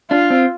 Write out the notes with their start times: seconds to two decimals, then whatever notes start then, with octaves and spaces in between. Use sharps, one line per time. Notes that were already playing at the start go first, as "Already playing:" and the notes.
0.11 D4 F4
0.30 C4